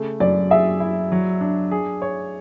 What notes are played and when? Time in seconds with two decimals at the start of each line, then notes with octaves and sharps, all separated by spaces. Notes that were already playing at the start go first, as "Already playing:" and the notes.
Already playing: C#3 A3
0.20 F#2 D5
0.50 G#4 E5
0.80 E4
1.12 F#3
1.41 D4
1.71 G#4
2.02 C#5